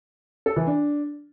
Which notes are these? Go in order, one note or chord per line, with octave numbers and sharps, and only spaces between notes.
A4
E3
D4